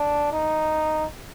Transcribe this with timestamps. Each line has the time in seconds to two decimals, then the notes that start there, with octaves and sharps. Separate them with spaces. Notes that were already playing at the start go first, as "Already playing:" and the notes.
Already playing: D4
0.33 D#4